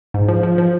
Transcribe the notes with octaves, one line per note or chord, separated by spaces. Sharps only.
G#2
F3
F3
F3